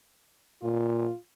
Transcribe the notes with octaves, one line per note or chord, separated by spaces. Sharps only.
A#2 F4